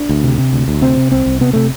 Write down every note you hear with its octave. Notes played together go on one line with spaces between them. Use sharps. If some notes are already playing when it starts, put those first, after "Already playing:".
Already playing: D4
D2
C3
C3
D2
D2
C3 C4
C3
C2 C4
C2
C3 B3
C3 A3